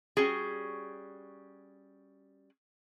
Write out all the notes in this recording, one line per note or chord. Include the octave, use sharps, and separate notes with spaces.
G3 C#4 F#4 G#4